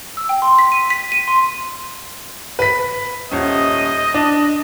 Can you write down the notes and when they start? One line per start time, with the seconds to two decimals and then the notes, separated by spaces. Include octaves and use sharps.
0.17 E6
0.29 G5
0.42 C6
0.59 B6
0.72 D#7
0.90 B6
1.12 D#7
1.28 C6
2.59 B4 B6
3.31 D#1 C#4 D#5
4.14 D4